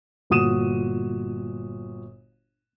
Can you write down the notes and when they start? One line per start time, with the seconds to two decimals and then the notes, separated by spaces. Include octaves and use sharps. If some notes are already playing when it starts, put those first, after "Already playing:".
0.30 G1 A#2 F#4 D#6 D#7 E7